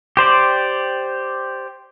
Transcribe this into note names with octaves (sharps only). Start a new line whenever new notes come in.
G4 C5 D5